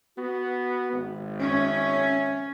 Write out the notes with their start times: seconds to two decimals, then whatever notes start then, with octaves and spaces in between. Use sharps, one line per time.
0.18 B3 F#4
0.93 G#1
1.40 C#4 E5